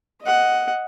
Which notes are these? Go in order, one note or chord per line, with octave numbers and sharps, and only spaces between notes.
D#5 F#5